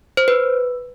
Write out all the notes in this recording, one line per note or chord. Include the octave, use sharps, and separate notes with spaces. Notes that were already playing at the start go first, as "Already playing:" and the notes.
C5
B4